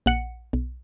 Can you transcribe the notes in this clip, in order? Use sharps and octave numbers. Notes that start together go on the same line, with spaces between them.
A#1 F#5 C#7
B1